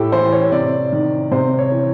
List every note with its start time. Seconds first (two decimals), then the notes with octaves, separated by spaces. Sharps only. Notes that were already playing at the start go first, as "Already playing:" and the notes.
Already playing: A2 G4 A4
0.12 E3 C5
0.32 C#5
0.52 C3 D5
0.92 D#3
1.31 C3 C5
1.59 C#5
1.72 E3